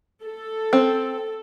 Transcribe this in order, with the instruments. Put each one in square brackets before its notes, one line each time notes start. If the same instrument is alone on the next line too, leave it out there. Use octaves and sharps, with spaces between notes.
[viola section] A4
[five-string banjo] C4